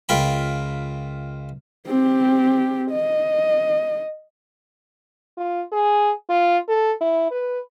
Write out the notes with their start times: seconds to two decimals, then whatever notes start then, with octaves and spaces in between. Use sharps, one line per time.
0.09 C#2 F4 A#4 G5 B5
1.87 C4 G4
2.91 D#5
5.37 F4
5.72 G#4
6.29 F4
6.68 A4
7.01 E4
7.31 B4